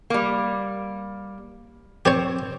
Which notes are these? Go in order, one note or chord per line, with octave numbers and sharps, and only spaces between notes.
G3 A#3
C4 G4 C5 C#5